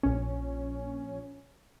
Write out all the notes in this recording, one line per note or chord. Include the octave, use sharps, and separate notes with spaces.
A#1 C#4